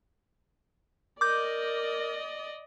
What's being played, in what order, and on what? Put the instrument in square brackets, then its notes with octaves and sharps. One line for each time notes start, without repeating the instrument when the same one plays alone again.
[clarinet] A#4 [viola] D5 D#5 [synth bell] D6 G6